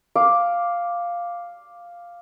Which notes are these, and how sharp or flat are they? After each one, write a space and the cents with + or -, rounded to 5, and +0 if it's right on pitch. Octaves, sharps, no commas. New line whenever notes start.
F5 +0 D6 +0